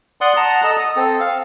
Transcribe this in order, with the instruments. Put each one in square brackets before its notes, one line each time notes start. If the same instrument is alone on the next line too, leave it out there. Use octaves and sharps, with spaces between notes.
[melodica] D5 F#5 C6 D#6
F#5 A5 A#5
A4 D#5 A5
D#6
C4 A4
F5